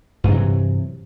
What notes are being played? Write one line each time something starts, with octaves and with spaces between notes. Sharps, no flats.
G2 C3 E3 F#3